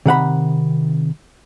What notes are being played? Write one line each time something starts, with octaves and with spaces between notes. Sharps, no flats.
C3 D#3 F#5 B5